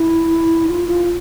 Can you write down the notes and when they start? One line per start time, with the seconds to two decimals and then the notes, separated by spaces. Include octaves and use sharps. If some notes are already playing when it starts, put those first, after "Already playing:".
Already playing: E4
0.67 F4
0.87 F4